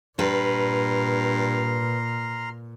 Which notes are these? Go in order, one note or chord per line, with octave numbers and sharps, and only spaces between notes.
G2 A#2 B4 A#5 C6 F6